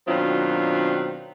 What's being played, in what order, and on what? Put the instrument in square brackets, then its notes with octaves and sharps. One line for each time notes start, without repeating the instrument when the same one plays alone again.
[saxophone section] B2 D#3 F#3 C4 D4 F4